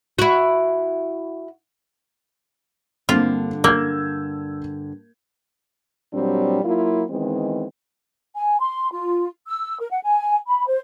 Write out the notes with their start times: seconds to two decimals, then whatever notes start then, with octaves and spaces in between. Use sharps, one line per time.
0.19 E4 F#4
3.09 G2 D3 A#3 C4 F4
3.64 A#3 E6 G6 G#6
6.13 A#2 F#3 G3 C4 D4
6.64 F#3 A#3 E4 F4
7.10 D#3 E3 G#3 B3 C4
8.36 G#5
8.61 C6
8.92 F4
9.48 E6
9.80 A#4
9.92 F#5
10.04 G#5
10.47 B5
10.66 C5